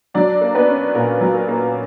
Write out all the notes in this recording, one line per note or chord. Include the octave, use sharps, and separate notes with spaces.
F#3 D4 D5
A#3
B3 B4
C#4
A#2 A#4
F#3
A#4
A#3